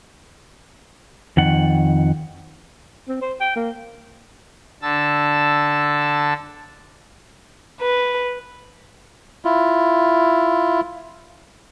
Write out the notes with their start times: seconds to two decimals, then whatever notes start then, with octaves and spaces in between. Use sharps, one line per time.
1.37 F2 D#3 F#5
3.08 C4
3.21 C5
3.40 G5
3.56 A#3
4.82 D3 A5 E6
7.80 B4
9.45 E4 F4